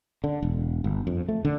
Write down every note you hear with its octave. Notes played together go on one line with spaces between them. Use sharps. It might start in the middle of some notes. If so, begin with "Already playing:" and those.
D3
E1
G1
F2
A3
D3